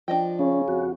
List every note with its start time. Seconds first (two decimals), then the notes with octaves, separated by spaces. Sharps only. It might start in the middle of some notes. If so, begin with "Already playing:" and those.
0.08 F3 D4 D#5 G5
0.39 C#3 C#4
0.68 F2 F#4